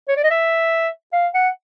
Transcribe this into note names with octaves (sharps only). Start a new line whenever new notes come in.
C#5
D5
D#5
E5
F5
F#5